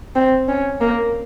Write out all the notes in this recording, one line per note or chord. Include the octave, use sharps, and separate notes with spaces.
C4
C#4
A#3